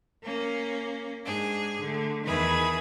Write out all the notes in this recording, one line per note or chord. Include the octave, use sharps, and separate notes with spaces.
A#3 C#4
G#2 D4 G#4
D3 A3
E2 D#3 E4 G#4 B4